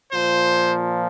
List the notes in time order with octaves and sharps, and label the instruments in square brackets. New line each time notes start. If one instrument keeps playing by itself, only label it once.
[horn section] A#2 F3 C5